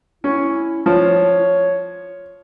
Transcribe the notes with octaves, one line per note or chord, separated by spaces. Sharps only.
C#4 E4
F3 C#5